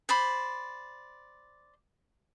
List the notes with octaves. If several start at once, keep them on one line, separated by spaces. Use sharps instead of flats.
C5 D5 B5